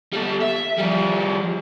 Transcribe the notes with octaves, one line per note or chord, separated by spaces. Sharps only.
G3 A4
E5
F3 G3